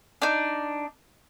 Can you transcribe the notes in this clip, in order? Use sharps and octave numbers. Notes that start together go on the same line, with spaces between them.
D4 D#4